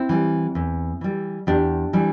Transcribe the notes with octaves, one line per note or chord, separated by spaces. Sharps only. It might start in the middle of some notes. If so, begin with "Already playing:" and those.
Already playing: C4 E4
E3 G3
E2
E3 G3
E2 D4 G4
E3 G3